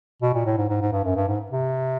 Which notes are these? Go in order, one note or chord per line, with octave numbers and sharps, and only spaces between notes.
B2
A#2
A2
G#2
G#2
G#2
G2
F#2
G2
G#2
C3